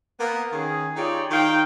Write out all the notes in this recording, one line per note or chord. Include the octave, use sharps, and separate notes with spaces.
A#3 B3
D#3 C#4 G#4
D#4 F4 G4 G#4 C#5 D5
D#3 D#4 F5 G5